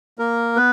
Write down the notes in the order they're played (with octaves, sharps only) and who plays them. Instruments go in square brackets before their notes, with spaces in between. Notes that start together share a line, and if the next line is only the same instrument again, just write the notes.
[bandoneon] A#3 A#4
B3 B4